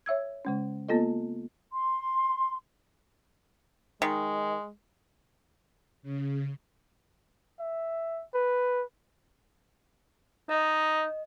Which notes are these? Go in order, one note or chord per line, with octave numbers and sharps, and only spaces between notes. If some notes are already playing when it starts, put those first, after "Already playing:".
C#5 E5 E6 G#6
C#3 G#3 C#4
A#3 B3 F4 A4 D#5
C6
D#3 G#3
C#3
E5
B4
D#4 D#5